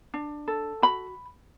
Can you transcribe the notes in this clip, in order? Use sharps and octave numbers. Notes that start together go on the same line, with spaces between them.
D4
A4
F#4 B5